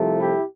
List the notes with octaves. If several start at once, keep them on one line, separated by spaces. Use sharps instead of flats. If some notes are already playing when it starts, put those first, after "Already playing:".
Already playing: C2 C3 F3 A3
E4 G4